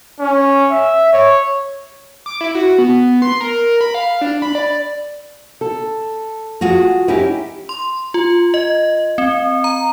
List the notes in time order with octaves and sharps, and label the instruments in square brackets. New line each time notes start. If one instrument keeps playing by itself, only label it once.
[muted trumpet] C#4
E5
C#5
[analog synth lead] D6
E4
F#4
B3
C6
A#4
B5
F5
D4
B5
D5
[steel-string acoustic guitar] A4
[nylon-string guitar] F4 F#4 G#4
[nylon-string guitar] C#4 D#4 G4 [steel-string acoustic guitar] E4
[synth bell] C6
F4
D#5
C4
A#5